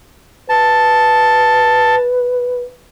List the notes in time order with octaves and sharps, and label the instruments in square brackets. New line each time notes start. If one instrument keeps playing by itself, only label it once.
[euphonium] B4 [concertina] A5